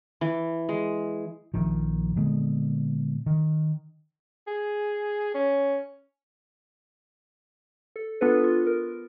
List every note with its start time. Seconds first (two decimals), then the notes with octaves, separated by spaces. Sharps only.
0.21 E3
0.69 G#3
1.54 A#1 D#3 F3
2.16 A#2 D3 G#3 B3
3.26 D#3
4.47 G#4
5.34 C#4
7.96 A4
8.21 B3 D4 F4 A4 B4
8.44 F4
8.67 A#4